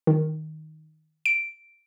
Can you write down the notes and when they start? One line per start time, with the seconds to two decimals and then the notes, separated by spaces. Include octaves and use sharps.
0.07 D#3
1.26 D7